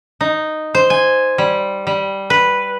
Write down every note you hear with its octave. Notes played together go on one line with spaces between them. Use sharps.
D#4
C5
G#5
G3
G3
B4